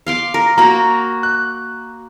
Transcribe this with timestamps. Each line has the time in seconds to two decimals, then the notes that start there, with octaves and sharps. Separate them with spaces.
0.06 F5 C6 D6
0.34 A#4
0.58 A#3 F#4 A#5
1.23 F#6